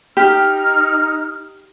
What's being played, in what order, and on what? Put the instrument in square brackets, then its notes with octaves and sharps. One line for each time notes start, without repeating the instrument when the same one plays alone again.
[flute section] D#4 F6 [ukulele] G4